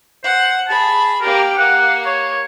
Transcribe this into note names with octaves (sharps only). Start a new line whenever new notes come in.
C5 F#5
G#4 A5 B5
A#3 G4 A#4
A#3 F#5
C#5